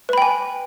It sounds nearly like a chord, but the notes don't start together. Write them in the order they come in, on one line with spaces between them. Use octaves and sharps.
B4 B5 G5 G#5